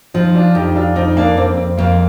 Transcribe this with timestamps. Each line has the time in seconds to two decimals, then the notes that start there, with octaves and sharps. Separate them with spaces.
0.14 F3 C4 D#4
0.34 D4 F4
0.55 F2 D#4 G4
0.75 D4 F4
0.96 F2 C4 D#4
1.17 A#3 D4
1.37 F2 C4
1.57 C4
1.78 F2 A#3